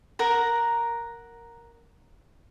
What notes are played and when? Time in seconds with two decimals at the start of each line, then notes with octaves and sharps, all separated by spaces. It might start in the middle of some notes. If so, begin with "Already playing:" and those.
0.19 A#4 F#5 A#5